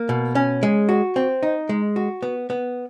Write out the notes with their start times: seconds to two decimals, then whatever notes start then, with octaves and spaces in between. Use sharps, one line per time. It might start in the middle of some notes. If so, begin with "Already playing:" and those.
Already playing: A#3
0.09 B2
0.35 C#4
0.63 G#3
0.89 F#4
1.16 C4
1.43 D#4
1.69 G#3
1.96 F#4
2.22 B3
2.50 B3